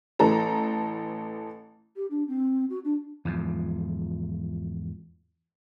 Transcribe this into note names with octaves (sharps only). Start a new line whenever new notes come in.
A1 E3 A4 A#5
G4
D4
C4
F#4
D4
E2 G#2 F3